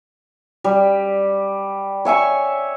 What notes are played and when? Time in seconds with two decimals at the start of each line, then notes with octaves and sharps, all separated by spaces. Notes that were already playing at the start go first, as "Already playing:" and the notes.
0.64 G3
2.05 C#5 E5 G#5 C#6